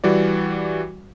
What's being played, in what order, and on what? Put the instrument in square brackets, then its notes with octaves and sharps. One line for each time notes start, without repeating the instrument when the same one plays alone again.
[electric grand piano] E3 G3 F#4 D5